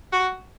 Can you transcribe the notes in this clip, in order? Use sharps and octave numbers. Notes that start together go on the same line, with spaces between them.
F#4